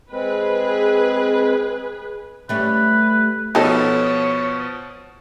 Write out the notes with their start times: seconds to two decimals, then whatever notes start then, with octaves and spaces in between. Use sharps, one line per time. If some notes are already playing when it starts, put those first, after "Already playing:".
0.12 G#3 C4 G#4 B4
2.49 G3 A3 C#4 B4
3.55 B2 F3 B3 D#4 A4 C#5